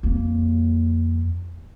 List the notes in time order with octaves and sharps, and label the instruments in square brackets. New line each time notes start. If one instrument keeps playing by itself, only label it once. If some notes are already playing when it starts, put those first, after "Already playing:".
[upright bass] F2 A#3